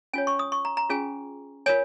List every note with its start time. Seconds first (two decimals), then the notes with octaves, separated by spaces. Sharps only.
0.13 C#4 F4 C#5 G#5
0.27 C#6
0.39 D#6
0.52 C#6
0.65 A#5
0.77 A#5
0.90 C#4 F4 G#4 G#5
1.66 F4 A#4 C#5 G#5